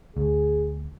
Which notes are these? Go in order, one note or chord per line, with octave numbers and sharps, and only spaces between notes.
D2 G#4